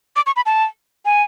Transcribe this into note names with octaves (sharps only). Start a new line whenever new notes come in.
D6
C#6
B5
A5
G#5